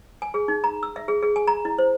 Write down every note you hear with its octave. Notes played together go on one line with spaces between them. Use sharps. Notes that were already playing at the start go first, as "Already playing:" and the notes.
G#5
G#4
D#4
A#5
E6
E5
G#4
G#4
G#5
A#5
E4
C5